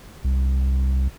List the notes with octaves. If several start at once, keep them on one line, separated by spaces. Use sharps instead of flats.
C2